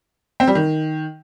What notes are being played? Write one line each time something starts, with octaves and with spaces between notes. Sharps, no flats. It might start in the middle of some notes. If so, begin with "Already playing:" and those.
C4
G3
D#3